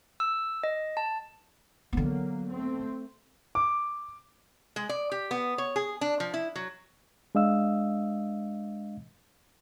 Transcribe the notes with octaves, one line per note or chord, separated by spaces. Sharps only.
E6
D#5
A5
D3 F#3 A#3 B3
A3 C4
D6
G#3
D5
G4
B3
C#5
G#4
D4
F3
E4
F#3
G#3 D4 D#5 F5 E6